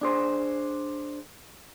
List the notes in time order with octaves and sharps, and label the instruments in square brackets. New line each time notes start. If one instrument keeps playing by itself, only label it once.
[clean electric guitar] D4 G#4 C5